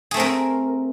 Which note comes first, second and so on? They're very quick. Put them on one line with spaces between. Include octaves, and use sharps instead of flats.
G#4 A3 C4 A#4